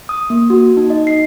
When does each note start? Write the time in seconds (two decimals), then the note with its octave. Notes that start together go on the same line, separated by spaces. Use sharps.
0.09 D#6
0.30 A#3
0.50 F#4
0.77 D#4
0.90 D#5
1.07 C7